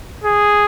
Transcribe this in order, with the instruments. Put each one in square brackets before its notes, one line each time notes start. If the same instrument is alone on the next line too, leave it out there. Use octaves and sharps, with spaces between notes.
[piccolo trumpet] G#4